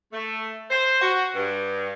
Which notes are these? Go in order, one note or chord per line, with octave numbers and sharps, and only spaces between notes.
A3
C5
F#4
G2